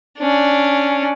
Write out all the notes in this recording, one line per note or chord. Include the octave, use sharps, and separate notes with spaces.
C#4 D4